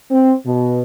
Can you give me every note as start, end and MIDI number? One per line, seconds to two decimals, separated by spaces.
0.11 0.33 60
0.45 0.82 47